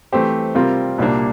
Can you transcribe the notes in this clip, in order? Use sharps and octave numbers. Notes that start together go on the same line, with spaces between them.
E3 A3 C4 G4 C5
C3 G3 C4 F4 A#4
C2 A#2 G3 A#3 D4